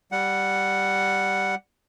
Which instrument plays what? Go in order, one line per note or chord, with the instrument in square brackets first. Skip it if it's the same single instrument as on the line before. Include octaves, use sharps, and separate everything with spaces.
[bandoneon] G3 F#5